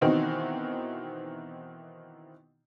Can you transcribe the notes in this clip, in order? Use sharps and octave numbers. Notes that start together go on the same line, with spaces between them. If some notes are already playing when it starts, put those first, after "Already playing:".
B2 D#3 E3 C4 D#4 F#4